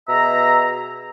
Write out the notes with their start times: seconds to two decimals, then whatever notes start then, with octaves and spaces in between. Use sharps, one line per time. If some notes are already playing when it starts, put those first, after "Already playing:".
0.09 B2 G#4 E5 A#5